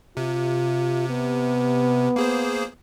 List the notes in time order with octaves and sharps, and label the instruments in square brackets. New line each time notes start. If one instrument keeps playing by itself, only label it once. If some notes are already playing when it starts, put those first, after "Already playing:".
[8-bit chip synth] C3 [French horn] F4
[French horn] B3
[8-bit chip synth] A#3 G#4 C5